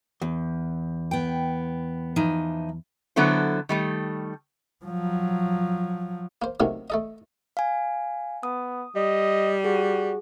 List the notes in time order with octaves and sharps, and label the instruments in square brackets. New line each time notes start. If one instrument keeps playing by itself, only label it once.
[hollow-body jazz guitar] E2
[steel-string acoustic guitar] B3 G5
E3 F3 D#4
[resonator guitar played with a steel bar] D3 F#3 B3 E4 A4 C5
D#3 G3 A3
[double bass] F3 F#3
[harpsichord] A#3 C5
C3 D#3 F#3 A3 A#3 C#4
A3 A4 D#5
[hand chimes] F5 G#5
[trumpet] B3 [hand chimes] D#6
[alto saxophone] G3 [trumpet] D#5
[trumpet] F#4 [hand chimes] G#4